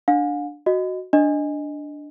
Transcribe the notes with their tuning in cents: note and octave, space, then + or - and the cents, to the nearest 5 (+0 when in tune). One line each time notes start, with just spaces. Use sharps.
D4 +5 F5 +40
F#4 +0 D#5 +0
D4 +0 D#5 +0